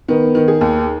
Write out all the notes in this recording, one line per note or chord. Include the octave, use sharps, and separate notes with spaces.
D#3 B3
D#3
G#4
D#2